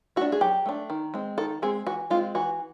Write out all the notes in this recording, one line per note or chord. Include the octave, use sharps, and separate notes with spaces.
A3 D4 F#4
G#4
F#3 G4
A3 D4
D#3
G#3 C4
D#3 A4
G#3 C4 G#4
E3 F#4
G#3 C4 F4
E3 F#4